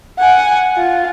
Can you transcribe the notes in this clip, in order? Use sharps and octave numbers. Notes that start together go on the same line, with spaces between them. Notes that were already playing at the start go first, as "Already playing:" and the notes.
F#5 G#5
F4